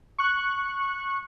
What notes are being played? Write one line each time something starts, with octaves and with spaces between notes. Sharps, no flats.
C#6 F#6